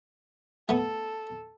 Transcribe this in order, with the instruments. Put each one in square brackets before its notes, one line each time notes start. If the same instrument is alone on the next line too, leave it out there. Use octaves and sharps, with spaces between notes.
[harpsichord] A3 B3 [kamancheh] A4